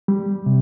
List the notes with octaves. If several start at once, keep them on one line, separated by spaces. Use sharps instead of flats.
G3
C3